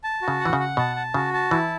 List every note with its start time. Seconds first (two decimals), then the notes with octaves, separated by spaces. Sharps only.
0.04 A5
0.22 F#4
0.28 C#3
0.40 F#5
0.45 E3
0.53 C#3
0.60 F#5
0.77 B2 A5
0.96 A5
1.14 C#3 F#4
1.34 A5
1.51 E3 E4